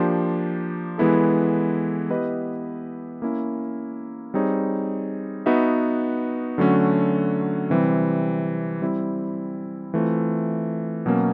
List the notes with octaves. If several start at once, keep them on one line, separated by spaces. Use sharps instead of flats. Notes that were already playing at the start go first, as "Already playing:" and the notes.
Already playing: F3 A#3 D4 G4 C5
E3 G#3 B3 E4 A4
B3 E4 G4 B4 D#5
A#3 C#4 E4
G3 C4 D#4 G#4 C#5
B3 D#4 F#4 B4 E5
D3 F#3 A3 C#4 F#4
C3 E3 G3 C4
G3 C4 E4
E3 A3 C4 F4
B2 F#3 A#3 C#4